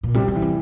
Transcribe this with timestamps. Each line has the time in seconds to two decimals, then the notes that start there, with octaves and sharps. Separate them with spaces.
0.03 A#2
0.14 C3 G3
0.28 C3
0.35 E3
0.42 C3